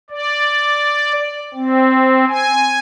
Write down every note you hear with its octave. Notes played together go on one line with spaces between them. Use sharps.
D5
C4
G#5